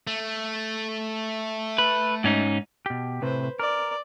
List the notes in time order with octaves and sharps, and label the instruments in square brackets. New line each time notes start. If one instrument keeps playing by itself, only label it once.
[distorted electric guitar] A3
[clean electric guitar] B4
G#2 C#4 D#4
[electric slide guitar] B2 G4
[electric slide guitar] A2 C3 [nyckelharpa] B4 C5
[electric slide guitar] A#4 [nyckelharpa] D5